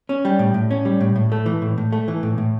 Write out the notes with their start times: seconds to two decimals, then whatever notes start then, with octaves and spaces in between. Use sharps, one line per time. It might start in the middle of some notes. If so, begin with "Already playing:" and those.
0.09 C#4
0.25 G3
0.39 A2
0.54 A2
0.71 C#4
0.85 G3
1.00 A2
1.16 A2
1.32 A3
1.46 E3
1.62 A2
1.78 A2
1.92 A3
2.08 E3
2.23 A2
2.38 A2